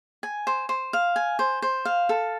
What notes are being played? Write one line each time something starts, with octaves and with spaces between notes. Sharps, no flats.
G#5
C5
C5
F5
G#5
C5
C5
F5
A4